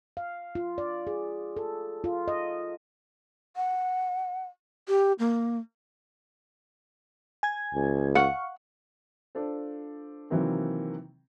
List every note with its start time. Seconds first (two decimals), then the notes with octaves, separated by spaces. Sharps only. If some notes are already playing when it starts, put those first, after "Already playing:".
0.17 F5
0.55 F4
0.78 D5
1.07 G#4
1.57 A4
2.04 F4
2.28 D#5
3.56 F#5
4.88 G4
5.19 A#3
7.43 G#5 G#6
7.75 C#2
8.15 F5 F#5 C#6
9.35 D4 F4 A4 C5
10.30 C3 D#3 E3 F#3 A#3 C4